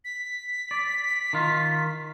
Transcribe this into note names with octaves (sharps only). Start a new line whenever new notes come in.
B6
D5
D#3 F4